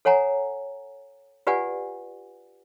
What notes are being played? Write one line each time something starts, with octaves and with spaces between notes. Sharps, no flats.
A4 C#5 F#5 G#5 A#5
F4 G4 B4 D5 F#5 G#5